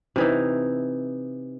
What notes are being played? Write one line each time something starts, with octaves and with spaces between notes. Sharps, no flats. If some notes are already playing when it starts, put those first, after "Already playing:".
C3 E3 D#4